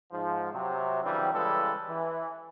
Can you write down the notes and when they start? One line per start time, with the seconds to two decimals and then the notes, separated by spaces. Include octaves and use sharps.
0.12 G#2 F3
0.53 C3 F#3
1.03 C#3 E3 F#3 G3 C4 D4
1.34 C#3 E3 G3 G#3 A4 B4
1.88 E3